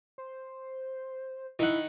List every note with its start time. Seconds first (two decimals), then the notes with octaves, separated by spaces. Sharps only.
0.18 C5
1.59 D#3 E4 F#5